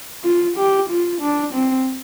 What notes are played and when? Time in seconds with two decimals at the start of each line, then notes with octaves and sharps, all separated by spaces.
0.24 F4
0.57 G4
0.90 F4
1.21 D4
1.53 C4